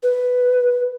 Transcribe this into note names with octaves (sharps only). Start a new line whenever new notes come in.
B4